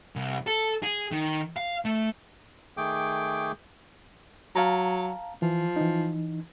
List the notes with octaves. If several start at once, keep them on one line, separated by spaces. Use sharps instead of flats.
C2
A4
G#4
D#3
F5
A3
D#3 A3 G#4 G5 D6
F#3 F5 A5 A#5
E3 F3
E3 D#4